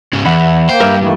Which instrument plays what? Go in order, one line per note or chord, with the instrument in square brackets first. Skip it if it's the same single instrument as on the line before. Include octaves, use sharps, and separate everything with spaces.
[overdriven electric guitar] G#2 C#3
[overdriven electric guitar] E2 [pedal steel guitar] E5 F#5 B5
[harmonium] A#3 G5 [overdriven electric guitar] C5
[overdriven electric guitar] G2 [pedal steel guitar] A#4 B4 E5
[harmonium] D#3 A3 A#3 [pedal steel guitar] E3 G3